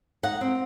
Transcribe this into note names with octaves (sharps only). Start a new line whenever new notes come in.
D#4 F#5
C4